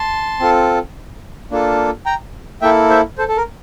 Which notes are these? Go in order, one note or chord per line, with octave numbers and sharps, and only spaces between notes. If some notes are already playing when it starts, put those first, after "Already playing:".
Already playing: A5 C6
C4 F4 A4
A#3 D4 F4 A4
G5 A#5
A#3 E4 A4 E5 G5
C5 E5
A4 C5
A4
A#4